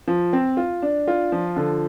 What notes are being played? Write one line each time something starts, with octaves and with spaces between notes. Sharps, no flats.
F3
C4
F4
D4
F4
F3
D3